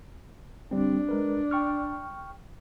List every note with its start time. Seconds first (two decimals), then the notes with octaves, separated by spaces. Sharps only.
0.71 G1 G3 C4 D4
1.09 G#3 A#4 B4
1.51 G5 C#6 F6